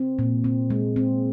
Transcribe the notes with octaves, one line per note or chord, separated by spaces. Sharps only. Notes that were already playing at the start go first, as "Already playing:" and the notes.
Already playing: C4
A#2
C4
G#3
C4